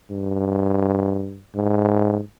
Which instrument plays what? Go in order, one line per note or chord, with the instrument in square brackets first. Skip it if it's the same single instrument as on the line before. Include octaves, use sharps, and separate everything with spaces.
[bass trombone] G2
G#2